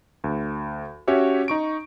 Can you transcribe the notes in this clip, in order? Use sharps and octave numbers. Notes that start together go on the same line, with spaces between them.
D2
C#4 F#4 G4 C#5 E5
D#4 C#6 D7